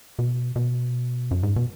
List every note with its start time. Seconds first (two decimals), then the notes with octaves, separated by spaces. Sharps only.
0.19 B2
0.56 B2
1.31 F#2
1.43 G#2
1.56 B2